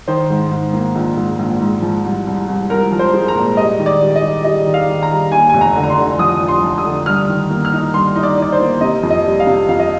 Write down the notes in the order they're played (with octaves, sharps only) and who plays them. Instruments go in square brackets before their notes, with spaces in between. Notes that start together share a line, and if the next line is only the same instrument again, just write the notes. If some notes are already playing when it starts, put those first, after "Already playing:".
[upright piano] D#3 C5
G#2
G#2
A#3
A#1
G#2
A#1
G#2
F3
C2
C2
C2
C2 A#4
F3
C5
G#3
A#5
A#2
G3 D#5
D#3
D5
G3
D#5
G3
G3 D#5
D#3
F5
D#3
A#5
G3
D#2 G#5
F1 G#5
A#5
D3
A#5
C6
D3
F3 D#6
F3
C6
F3
D#6
D3
G2 F6
D#3
A#3
F6
D#4
G2 C6
D#4
D5
D#4 D5
C5
A#3
C3 D#5
F2
D#5
G3
F5
C3
F2 F5
D#5